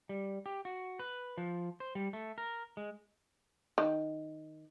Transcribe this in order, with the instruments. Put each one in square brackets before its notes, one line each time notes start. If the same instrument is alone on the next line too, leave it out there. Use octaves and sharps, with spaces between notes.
[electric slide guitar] G3
G4
F#4
B4
F3
C5
G3
A3
A#4
G#3
[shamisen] D#3